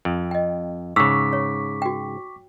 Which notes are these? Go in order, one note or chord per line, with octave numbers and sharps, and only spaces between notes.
F2
D#5 G5
G#2 C#3 C#6 D6 E6 B6
C#5
F#4 G5